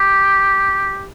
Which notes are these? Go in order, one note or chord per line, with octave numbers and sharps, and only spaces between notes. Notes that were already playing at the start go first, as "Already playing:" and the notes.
Already playing: G4